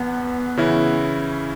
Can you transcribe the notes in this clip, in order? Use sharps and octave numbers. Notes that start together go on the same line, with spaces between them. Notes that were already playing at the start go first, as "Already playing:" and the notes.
Already playing: E2 B3
C#3 E3 C#4 E4